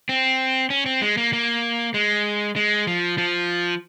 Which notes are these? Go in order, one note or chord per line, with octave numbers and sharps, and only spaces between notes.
C4
C#4
C4
G#3
A#3
A#3
G#3
G#3
F3
F3